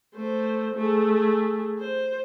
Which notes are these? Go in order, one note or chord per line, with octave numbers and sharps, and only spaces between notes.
A3 C5
A3 G#4
C5